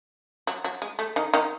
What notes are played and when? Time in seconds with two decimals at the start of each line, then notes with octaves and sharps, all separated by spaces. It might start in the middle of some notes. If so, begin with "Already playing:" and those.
0.47 F#3
0.64 F#3
0.82 G#3
0.99 A3
1.16 D#3 D#4
1.34 D#3 D#4